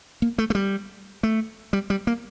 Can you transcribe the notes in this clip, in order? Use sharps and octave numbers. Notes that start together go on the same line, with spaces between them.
A#3
A3
A3
G3
A3
G3
G3
A#3